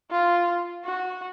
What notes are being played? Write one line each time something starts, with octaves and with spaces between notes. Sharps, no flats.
F4
F#4